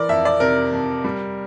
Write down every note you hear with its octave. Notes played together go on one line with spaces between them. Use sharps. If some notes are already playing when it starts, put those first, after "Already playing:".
Already playing: E3 A#4 D5
F2 E5
D5
C3 A#4
F2
G3